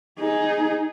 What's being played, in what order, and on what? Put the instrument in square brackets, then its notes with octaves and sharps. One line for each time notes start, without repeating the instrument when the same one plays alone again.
[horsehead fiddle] D#4 G#4